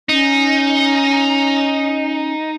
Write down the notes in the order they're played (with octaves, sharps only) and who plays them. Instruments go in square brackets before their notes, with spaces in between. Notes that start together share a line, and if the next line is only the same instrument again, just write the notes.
[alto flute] C#4 [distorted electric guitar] D#4